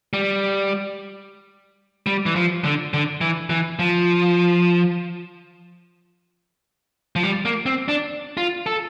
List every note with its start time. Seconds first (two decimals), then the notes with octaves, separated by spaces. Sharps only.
0.13 G3
2.06 G3
2.26 E3
2.35 F3
2.65 D3
2.94 D3
3.21 E3
3.50 E3
3.79 F3
7.16 F3
7.23 G3
7.45 A#3
7.66 C4
7.88 D4
8.37 F4
8.66 A4